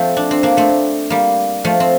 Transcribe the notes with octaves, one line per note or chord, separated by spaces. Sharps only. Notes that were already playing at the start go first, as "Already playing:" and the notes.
Already playing: F3 A3 C4
D4
C4
A#3 D4
A3 C4
G3 A#3
F3 A3
C4